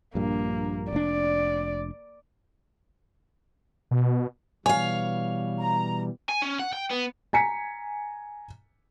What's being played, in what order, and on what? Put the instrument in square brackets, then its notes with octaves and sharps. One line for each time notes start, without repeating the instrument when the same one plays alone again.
[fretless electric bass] A#1 G2 [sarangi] A#3
[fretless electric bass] F1 D4 [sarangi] D5
[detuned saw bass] B2
[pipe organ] B2 E3 G3 [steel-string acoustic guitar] C#5 F5 [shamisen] G#5
[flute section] A#5
[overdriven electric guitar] G#5
C#4
F#5
G5
B3
[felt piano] G#5 A#5 B6 C#7